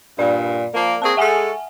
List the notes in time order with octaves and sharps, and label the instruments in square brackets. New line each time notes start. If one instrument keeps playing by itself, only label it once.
[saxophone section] G2 A#2 [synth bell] D5
[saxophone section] F3 A#3
[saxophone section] A#3 C4 G#4 [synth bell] A5 C#6
[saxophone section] G#3 G#4 A4 [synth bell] E5 F#5 G#5